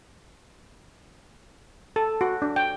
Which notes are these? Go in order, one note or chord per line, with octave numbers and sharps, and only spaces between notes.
A4
F#4
D4
G5